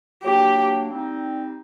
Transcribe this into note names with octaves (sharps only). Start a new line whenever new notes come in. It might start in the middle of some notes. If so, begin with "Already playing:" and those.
F#3 A#3 D4 G4
G3 C4 D#4